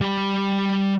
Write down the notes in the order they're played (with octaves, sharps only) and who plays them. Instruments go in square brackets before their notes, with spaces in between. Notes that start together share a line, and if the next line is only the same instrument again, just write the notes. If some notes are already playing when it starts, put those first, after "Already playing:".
[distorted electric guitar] G3 B5